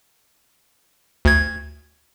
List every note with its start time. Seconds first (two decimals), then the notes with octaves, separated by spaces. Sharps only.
1.25 D2 G#6